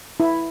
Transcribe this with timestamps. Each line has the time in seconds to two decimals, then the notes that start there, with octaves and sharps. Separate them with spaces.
0.20 E4